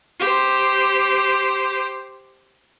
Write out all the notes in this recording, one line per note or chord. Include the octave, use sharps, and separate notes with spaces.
G4 C5